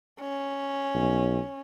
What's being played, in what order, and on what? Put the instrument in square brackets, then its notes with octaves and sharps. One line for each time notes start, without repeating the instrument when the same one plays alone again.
[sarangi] C#4
[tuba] B1